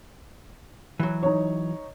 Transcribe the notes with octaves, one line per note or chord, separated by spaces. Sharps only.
E3 F#3
D#4 C#5